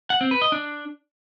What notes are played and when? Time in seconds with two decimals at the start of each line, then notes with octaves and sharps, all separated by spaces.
0.10 F#5
0.21 C4
0.31 B4
0.42 D#5
0.52 D4